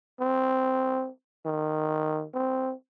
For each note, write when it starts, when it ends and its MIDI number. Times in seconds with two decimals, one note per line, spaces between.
0.20 1.09 60
1.46 2.25 51
2.34 2.73 60